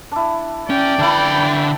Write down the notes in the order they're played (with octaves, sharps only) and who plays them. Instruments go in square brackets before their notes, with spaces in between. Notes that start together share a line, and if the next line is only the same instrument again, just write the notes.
[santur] D4 E4
[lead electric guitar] C#4 [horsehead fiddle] D5 G5
[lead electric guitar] D3 B5 [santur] D4 E4 B4